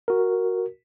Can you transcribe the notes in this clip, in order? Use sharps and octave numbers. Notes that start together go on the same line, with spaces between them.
F#4 A#4